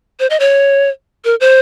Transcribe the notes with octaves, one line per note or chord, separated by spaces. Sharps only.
C5
D#5
C#5
A#4
C5